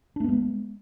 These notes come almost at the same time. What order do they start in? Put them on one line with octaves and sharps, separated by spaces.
D4 A3 B3 G#3